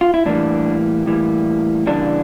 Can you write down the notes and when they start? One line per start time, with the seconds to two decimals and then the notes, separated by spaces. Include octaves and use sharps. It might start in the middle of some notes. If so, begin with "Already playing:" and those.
0.01 F4
0.14 E4
0.26 A2 E3 G3 A#3 D4
1.06 A2 E3 G3 A#3
1.86 C#3 E3 G3 A#3 D4